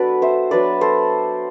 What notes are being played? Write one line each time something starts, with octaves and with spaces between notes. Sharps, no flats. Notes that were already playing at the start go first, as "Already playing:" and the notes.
Already playing: F#3 B3 D4 F#4 A4 B4 D5
C5 E5
F#3 B3 D4 B4 D5
A4 C5